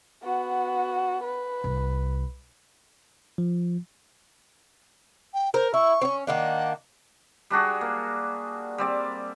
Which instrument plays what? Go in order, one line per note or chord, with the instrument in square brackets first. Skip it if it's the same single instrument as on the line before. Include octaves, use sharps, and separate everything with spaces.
[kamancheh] B3 F#4
B4
[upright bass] C2
[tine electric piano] F3
[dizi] G5
[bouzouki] A#4 [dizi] C5
[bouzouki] E4 [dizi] C#6
[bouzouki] C4 C#4
[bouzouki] D#3 A#3 D4 [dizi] F#5
[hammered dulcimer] G3 D4 F#4 G#4
A#3
G3 C4 D5